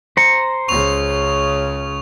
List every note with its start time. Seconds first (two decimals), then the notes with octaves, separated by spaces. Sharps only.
0.17 C5 A#5 C#7
0.68 C#2 C#3 C#6 F7